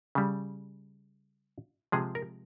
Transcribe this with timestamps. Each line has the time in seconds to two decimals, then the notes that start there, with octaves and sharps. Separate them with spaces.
0.15 C#3 G3
1.92 C3 F3 G#3 G#4
2.15 A#4